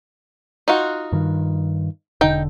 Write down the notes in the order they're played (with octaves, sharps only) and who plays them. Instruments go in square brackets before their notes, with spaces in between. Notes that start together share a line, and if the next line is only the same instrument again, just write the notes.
[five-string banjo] D#4 F4 F#4
[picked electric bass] G2 D#3
[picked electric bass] E1 D3 [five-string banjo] D#4 G5